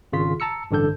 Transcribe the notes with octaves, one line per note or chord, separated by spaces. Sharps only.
G#1 C#3 F4 B6
A5 A#5 E6 C#7
A1 G2 D3 A4 G6